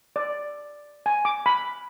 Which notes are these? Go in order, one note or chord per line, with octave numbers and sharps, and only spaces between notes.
D5
G#5
D6
B5